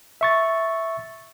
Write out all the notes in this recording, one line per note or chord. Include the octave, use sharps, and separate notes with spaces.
E5 C#6 A6